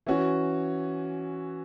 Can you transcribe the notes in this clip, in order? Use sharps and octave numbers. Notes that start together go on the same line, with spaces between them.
E3 C#4 F#4